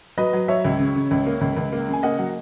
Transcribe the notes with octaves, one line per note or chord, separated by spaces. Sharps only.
F#3 B4 D#5
F#3
F#3 C#5 E5
C#2
C#3
C#3
C#2
A#3
C#2
C#2
A#3
C#3
G#5
A#3 D#5 F#5
F#3